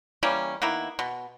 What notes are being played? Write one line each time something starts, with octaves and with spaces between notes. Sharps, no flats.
E3 G3 A#3 C#4
D#3 A#3 B3 E4
B2